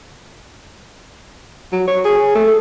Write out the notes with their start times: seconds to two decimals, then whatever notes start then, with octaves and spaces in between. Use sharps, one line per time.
1.72 F#3
1.87 C#5
2.05 G#4
2.35 A3